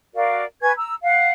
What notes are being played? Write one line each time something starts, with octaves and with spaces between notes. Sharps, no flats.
F#4 A#4 D5 F5
B4 G#5 C#6 G#6
A#5 E6
F5 F#5